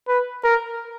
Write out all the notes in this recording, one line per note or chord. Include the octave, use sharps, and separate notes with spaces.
B4
A#4